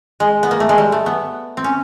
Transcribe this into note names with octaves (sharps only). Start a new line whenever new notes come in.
G#3
B3
A#3
A3
G#3
G3
A3
B3
C4
C#4